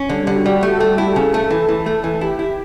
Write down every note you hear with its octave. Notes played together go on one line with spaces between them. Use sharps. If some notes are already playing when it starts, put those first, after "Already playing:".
Already playing: C#4
D3 G3
G3
D3
F#4
G3 G4
A3 A4
A3
E4
C#3 A4
A3
E3
E3
A3
E3
E4 G4
E4